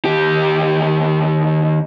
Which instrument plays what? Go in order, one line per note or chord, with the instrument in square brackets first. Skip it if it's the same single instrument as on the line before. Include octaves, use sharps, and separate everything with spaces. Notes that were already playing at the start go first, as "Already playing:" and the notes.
[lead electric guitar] D#2 G4